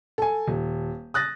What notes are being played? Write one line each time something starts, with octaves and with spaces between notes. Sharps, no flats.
A4 G#5
D#1
D#6 F#6 A6 A#6